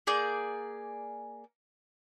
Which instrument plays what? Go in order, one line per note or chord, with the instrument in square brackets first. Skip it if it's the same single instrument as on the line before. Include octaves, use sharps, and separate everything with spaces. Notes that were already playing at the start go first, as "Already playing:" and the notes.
[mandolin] A#3 G#4 D5 G6